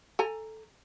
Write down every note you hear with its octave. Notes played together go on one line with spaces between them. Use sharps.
A4 G#5 A#5